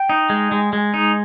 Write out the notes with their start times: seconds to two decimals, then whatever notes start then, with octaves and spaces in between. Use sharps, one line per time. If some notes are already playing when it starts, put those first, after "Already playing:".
Already playing: G5
0.09 D#4
0.30 G#3
0.52 G#3
0.73 G#3
0.94 D#4